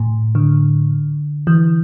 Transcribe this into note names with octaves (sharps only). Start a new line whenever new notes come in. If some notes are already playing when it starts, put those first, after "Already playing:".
Already playing: A2
D3
E3